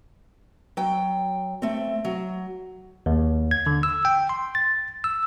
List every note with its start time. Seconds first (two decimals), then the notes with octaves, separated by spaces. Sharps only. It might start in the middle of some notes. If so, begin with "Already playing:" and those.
0.77 F#3 G5
1.62 A3 C4
2.05 F#3
3.06 D#2
3.51 G#6
3.66 D3
3.83 E6
4.05 G5
4.29 C6
4.55 A6
5.04 E6